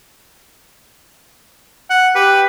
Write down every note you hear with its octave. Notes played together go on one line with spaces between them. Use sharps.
F#5
G4 B4